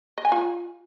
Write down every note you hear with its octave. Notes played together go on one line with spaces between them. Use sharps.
D#5
G#5
F4